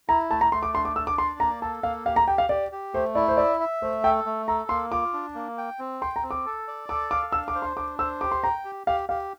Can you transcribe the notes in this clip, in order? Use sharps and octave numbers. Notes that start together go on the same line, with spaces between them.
E4 A#5
A3 A5
A#5
A3 C6
D6
D4 C6
D6
D4 E6
D6
D5 C6
A#3 A#5
A4 A5
A#3 F5
G4 F5
A#5
G4 G5
F5
G4 D5
G4
A3 C5
E4 D5
C5
D5 E5
E5
A3 C5
A4 G5
A3
A4 A#5
A#3 C6
F4 D6
D4
A#3
G5
C4
G5 C6
A#5
C4
D6
A4
D5
A4 D6
F5 D6
D4 E6
D6
C5
C6
D4 D6
C5 E6
G4 D6
C6
G5 A#5
G4
G4 F5
G4 F5